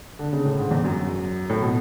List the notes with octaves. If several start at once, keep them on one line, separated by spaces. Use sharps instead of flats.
D3
C#3
A2
G#2
E2
F#2
A2
B2